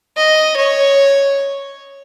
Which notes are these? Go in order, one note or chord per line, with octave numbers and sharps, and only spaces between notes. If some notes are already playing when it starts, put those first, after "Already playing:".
D#5
C#5